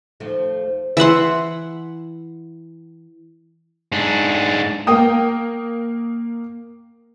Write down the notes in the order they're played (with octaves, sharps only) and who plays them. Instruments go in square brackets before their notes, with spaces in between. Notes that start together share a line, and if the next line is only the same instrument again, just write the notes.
[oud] D#2 F3 A3
[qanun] E3 E5 F#5 C6
[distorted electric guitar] G#2 D4
[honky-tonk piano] A#3 A#4 G5 D#6